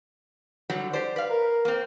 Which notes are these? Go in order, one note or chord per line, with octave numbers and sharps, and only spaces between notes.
D3 F#3 G3
G4 C5 D5
B4 F5
A#4
A#3 C4